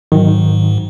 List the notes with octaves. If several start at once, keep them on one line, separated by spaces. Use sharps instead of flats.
G#2 D#3 F#3